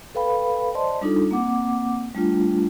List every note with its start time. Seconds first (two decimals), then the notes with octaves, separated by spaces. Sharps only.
0.15 A4 B4 F5 G5 B5
0.74 C5 D5 D#5 A5 C6
1.01 G3 D4 D#4 F4 A4
1.31 A#3 C4 F#5 D6
2.15 G3 A3 D4 F4 G5